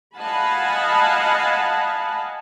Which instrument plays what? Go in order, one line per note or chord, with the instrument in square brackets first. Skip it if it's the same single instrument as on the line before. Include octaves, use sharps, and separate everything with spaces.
[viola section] D#5 F5 F#5 G#5 A5 B5